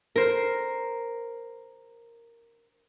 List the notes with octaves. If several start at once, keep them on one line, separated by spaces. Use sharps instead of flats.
A#4 C5